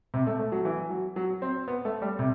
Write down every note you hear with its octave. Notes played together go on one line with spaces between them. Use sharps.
C3
A3
A3
F#3
E3
F#3
F#3
C4
B3
A3
G3
C3